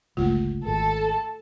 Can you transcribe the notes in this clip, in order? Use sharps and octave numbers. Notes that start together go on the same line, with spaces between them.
G1 C#2 A3 F4
G#1 A4 A5